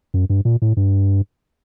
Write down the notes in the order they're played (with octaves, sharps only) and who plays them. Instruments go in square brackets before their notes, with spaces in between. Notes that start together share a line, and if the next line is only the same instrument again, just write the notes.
[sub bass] F#2
G2
A#2
A2
G2